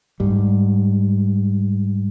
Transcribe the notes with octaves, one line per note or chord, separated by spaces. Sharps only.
G#2 G3